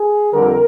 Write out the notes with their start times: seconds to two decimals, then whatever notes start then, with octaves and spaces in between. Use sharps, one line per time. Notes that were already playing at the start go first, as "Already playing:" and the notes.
Already playing: G#4
0.32 F2 D3 G3 A#4